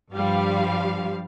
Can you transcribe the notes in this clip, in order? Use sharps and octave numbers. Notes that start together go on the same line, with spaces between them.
G2 F3 G3 F5